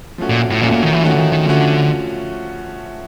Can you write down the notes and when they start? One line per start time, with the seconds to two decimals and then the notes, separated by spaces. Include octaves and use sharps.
0.18 F3 A3 C#4 F#4
0.29 A#2
0.50 A2
0.61 A#2 F3 A3 C#4 F#4
0.72 A#2
0.83 D#3
0.93 E3
1.04 D#3 F3 A3 C#4 F#4
1.13 D3
1.18 D#3
1.32 D#3
1.46 D3 F3 A3 C#4 F#4